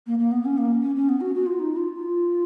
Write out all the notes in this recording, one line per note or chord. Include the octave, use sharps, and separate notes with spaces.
A#3
A#3
B3
C#4
A#3
C#4
C#4
B3
F#4
F#4
F4
D#4
F4
F4